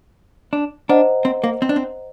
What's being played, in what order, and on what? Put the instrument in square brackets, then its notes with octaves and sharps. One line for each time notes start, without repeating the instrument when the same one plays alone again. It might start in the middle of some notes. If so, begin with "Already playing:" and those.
[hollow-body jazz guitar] D4
[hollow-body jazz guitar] D4 [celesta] C5 D#5 F#5 A#5
[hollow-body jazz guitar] C4
A#3
C4
D4
C4